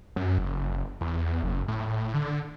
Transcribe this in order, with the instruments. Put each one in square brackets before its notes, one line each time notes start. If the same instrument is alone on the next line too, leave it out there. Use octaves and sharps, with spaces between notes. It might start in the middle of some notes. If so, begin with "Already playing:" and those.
[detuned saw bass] F#2
F#1
E2
F#1
A2
D3